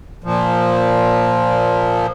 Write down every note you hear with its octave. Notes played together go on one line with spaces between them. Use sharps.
A#2 F3